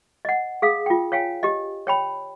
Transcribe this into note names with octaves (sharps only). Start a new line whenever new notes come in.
D#5 F#5
G#4 F5 D#6
F4 G5
C#5 F5 G5 G#5
G4 D#5
C#5 G5 B5